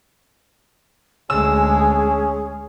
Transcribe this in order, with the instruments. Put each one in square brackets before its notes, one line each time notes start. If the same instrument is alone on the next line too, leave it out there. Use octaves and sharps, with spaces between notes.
[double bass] D2 G#3 [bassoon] C#4 [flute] G#4 [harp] E6